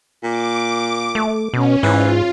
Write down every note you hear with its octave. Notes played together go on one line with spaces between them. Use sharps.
A#2 D6
A3
B2 C#4
G#2 E3 F4